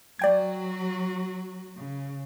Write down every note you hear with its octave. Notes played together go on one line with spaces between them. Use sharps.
F#3 F#4 D5 G5 G#6
C#3